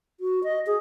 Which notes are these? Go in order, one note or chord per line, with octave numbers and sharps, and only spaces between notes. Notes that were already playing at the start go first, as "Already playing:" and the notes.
F#4
D#5
G#4